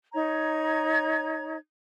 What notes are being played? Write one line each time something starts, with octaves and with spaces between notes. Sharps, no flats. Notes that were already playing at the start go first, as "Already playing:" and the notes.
D#4 C#5 A#5 G#6